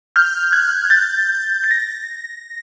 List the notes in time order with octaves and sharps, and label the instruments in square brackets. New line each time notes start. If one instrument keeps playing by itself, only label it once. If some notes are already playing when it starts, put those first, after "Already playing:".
[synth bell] F6 G6
F#6 G#6
G6 A6
A6
A#6